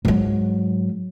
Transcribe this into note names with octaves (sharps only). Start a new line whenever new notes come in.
G#2 F#3